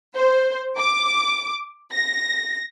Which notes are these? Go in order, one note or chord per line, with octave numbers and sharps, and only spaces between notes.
C5
D6
A#6